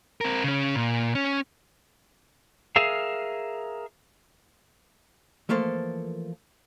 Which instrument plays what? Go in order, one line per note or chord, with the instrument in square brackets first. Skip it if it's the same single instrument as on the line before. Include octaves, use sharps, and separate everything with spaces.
[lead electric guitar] C4 A#4
C#3 C#4
A#2
C#4
[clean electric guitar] G#4 A#4 E5 F5
[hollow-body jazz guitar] E3 F3 A3 A#3 A4 C5